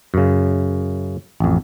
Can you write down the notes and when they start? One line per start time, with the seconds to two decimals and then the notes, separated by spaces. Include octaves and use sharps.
0.14 F#2 C#3
1.40 A1 F2